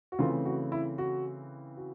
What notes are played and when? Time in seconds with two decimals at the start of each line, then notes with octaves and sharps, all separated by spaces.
0.12 F#4
0.19 C#3 E3 A3 C4 F4
0.45 F#4
0.72 E4
0.98 F#4
1.77 F#4